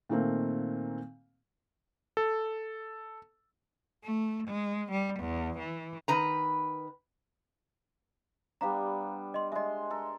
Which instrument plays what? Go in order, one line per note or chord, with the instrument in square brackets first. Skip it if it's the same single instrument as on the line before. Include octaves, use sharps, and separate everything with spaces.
[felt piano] A#2 D#3 A3 A#3 C4
[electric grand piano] A4
[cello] A3
G#3
G3
E2
E3
[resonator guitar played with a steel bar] D#3 B4 A#5
[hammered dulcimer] G3 B3 D4 [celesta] F5 A#5
[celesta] D#5 C6
[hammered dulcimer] G#3 C6 [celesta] D#5 E5
[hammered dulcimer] A4 A#4